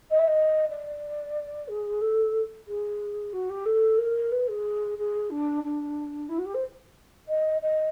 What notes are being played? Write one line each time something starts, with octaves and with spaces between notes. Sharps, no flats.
D#5
E5
D#5
D5
G#4
A4
G#4
F#4
G4
A4
A#4
B4
G#4
G#4
D4
D4
E4
F#4
G4
C5
D#5
D#5